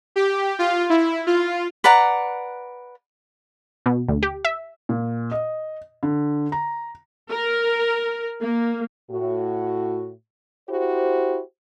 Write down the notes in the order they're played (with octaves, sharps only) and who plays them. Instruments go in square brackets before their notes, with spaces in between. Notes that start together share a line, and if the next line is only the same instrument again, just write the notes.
[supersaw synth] G4
F4
E4
F4
[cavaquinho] B4 D5 F#5 A#5
[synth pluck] B2
D2
G4
E5
[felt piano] A#2
D#5
D3
A#5
[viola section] A#4
A#3
[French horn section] A2 F#4
E4 F#4 G4 C5